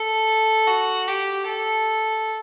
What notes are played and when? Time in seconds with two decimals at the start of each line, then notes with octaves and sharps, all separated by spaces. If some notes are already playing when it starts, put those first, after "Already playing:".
Already playing: A4
0.67 F#4
1.08 G4
1.47 A4